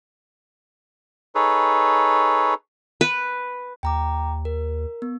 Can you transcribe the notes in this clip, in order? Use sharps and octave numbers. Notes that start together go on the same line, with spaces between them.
D#4 G#4 A4 B4 C#5
B4
D#2 G5 A#5 D6
A#4
B3